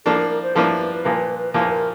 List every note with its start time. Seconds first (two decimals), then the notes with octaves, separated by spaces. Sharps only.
0.05 A2 F3 A#3 D4 A4
0.18 A#4
0.30 A#4
0.42 C5
0.55 A2 F3 A#3 D4 B4
1.04 A#2 F3 A#3
1.54 A#2 F3 A#3 B4
1.71 A#4